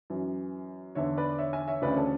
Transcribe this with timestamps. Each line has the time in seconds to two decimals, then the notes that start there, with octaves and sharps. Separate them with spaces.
0.10 F#2 E3
0.95 E2 D3 C#5 E5
1.17 B4 D5
1.38 C#5 E5
1.53 E5 G#5
1.68 C#5 E5
1.82 D2 C#3 E3 B4 D5
1.96 A4 C#5